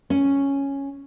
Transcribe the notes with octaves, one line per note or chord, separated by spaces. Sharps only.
C#4